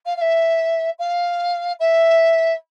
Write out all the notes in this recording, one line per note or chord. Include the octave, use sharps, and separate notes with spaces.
F5
F5
E5
F5
E5